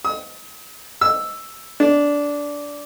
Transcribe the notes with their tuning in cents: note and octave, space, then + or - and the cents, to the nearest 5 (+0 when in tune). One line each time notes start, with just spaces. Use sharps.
D#6 +40
E6 +0
D4 -15